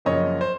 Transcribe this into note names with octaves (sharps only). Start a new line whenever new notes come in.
F#2 C#3 F3 A#3 C#5 D#5
C5